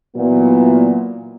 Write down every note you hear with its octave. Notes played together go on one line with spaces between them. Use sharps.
A#2 E3 F#3 B3